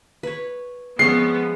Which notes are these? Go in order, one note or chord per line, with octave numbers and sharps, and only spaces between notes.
B4 C#5
F3 G#3 B3 C#4 A4 C7